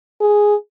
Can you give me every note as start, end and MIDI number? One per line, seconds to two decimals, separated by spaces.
0.21 0.55 68